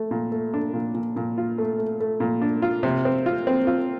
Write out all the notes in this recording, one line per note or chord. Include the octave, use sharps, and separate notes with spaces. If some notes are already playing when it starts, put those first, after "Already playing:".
Already playing: A3
A#2
A3
D4
A#2
A#2
A#2
F4
A3
A3
A3
A#2
D4
F4
C3
C4
F4
C4
F4